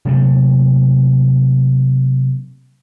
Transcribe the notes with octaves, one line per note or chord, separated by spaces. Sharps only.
C3 F#3 A3 A#3